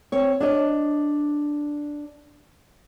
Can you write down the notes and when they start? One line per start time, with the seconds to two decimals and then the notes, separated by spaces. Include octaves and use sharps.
0.12 C4 C#5
0.40 D4 C#5 D#5